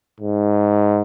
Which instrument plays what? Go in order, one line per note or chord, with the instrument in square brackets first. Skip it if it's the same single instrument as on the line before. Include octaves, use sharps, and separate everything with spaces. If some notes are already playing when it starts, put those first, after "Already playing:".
[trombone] G#2